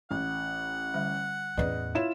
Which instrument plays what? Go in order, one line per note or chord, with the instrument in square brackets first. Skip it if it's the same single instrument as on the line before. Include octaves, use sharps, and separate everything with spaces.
[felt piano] A1 [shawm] F#5
[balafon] D3 G3 E5
[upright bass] E2 A2 [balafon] C#4 B4 D5 [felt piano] D#5
[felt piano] E4 F4 E7 [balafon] C#5